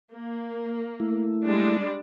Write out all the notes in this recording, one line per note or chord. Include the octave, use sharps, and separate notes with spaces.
A#3
A3 E4
G3 G#3 D4